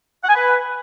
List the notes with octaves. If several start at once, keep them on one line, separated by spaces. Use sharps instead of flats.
F#5
G#5
B4